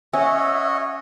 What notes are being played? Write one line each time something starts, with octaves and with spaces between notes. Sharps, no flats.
C#4 F#4 C#5 D#5 E5